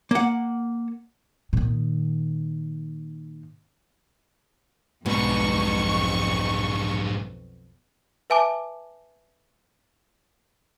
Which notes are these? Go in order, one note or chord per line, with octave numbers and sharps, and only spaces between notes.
A#3 F#5
A#2 D#3
B1 F2 G#2 B2 G3 C#6
B4 E5 G#5 A5 D6